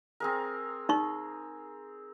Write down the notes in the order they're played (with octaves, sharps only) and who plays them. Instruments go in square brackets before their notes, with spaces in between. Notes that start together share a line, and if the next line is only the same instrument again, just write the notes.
[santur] C4 G#4 A#4
[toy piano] D#4 C#6